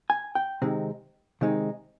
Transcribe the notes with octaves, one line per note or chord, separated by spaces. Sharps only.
G#5
G5
C3 D#3 G#3 C4 D#4
C3 D#3 G#3 C4 D#4